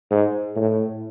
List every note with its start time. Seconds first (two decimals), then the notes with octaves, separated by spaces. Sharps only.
0.11 G#2
0.56 A2